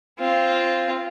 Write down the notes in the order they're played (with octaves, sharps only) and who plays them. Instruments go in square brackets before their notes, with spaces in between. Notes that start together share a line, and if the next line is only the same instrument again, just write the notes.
[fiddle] C4 F4